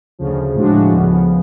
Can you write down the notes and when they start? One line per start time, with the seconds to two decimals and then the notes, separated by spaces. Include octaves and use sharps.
0.19 D2 C#3 F3
0.55 A2 F3 G#3 D4 F#4
0.92 D2 C#3 F3 B3